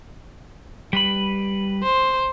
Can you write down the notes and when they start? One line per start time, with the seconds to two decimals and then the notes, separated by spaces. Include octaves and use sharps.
0.93 G3 B4 B5
1.83 C5